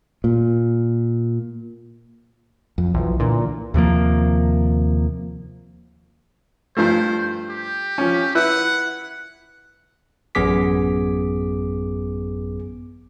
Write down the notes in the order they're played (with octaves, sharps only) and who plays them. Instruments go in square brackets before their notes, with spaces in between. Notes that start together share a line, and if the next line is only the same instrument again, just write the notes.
[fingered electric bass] A#2
[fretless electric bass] F2
[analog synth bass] B1 [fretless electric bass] E3 F3
[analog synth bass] A#2 [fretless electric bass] D3 E3
[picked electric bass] D#2 C3 F3 A#3
[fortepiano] G2 F3 A3 [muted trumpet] C5
[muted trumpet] G4
[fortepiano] F3 C#4
[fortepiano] E4 B4 E5 [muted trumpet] F#5
[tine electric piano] A1 F#2 B3 G#4 D6 B6